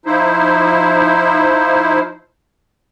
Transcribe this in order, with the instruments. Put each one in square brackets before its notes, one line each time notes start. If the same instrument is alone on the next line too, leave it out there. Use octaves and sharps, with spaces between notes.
[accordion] F3 D#4 E4 C5